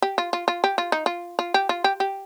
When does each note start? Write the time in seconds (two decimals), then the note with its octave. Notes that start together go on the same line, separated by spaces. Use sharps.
0.02 G4
0.18 F4
0.33 F4
0.48 F4
0.64 G4
0.78 F4
0.92 D#4
1.06 F4
1.39 F4
1.54 G4
1.69 F4
1.84 G4
2.00 G4